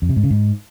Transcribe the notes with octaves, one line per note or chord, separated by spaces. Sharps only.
F2
C3
G#2
C#3
G#2